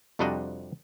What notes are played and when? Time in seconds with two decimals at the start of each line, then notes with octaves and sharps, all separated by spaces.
0.19 F2 C3 G3 D4 F#4 D#5